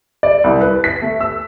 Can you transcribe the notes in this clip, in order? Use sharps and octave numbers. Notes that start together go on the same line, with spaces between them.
D5
C2
B4
B6
A3
E6